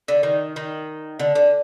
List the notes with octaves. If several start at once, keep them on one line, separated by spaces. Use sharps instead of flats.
D3
D#3
D#3
D3
D3